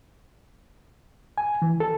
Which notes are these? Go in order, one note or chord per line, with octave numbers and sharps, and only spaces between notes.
G#5
E3
A4